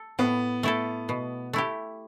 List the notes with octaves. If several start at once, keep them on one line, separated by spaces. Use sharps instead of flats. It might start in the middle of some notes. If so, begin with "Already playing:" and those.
Already playing: A4
A2 B3
A3 E4 A4
B2
A3 E4 G4